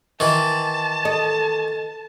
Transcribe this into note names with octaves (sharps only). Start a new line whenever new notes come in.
D#3 E3 A5
A4 D#5